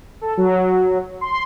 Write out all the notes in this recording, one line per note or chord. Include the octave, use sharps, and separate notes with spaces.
A4
F#3
C6